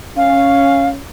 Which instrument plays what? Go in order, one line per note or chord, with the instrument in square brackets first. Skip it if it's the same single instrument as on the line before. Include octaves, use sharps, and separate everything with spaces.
[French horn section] C#4 [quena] F5